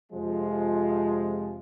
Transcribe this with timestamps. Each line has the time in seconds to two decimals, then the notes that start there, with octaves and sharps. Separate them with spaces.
0.11 F2 C3 F3 G#3